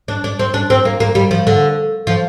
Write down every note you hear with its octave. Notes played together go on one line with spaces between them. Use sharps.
D4
D4
C4
D4
C4
A#3
A#3
G3
F3
D3
F3